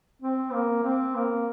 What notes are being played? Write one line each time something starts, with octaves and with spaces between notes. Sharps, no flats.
C4
A#3
C4
A#3